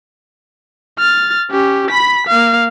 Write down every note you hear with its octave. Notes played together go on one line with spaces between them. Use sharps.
F6 A6
C#4 G4
B5 B6
A#3 F5